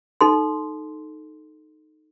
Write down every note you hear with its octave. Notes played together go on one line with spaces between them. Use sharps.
D#4 A4 C6